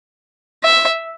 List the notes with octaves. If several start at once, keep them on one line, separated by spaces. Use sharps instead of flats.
E5